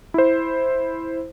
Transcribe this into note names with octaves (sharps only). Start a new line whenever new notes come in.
E4 C5